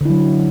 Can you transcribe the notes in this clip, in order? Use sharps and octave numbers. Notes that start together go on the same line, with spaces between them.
D3 F#3 E4